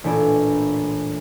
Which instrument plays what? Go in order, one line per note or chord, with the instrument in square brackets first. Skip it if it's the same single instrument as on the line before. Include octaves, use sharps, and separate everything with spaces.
[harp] A1 A#2 D4 E4 G#5 D7